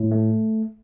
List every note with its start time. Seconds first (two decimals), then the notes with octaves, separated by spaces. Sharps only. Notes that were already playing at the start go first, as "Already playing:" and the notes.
Already playing: A2
0.11 A3